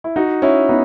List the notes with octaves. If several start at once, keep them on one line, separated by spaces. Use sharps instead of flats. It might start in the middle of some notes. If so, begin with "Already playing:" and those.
E4
D#4 F#4
C#4 E4
B3 D#4